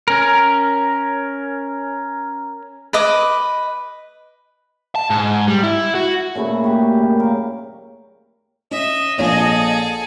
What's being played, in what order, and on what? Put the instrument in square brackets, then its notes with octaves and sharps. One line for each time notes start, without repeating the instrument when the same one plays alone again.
[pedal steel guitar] C#4 A#4
[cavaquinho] B4 D#5 D6
[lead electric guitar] A5
G#2
G3
E4
F#4
[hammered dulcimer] A#2 C#3 A3 E4
F#4 G4
F#2
A#4 F5
[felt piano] C#4 [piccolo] D#5 [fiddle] E5
[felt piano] A#1 A#2 C#5 [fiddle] G#4 A4